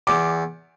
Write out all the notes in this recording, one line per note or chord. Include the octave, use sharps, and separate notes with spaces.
E2 D6